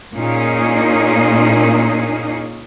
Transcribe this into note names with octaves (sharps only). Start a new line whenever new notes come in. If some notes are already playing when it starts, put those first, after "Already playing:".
A#2 A#3 C#4 D#4 G#4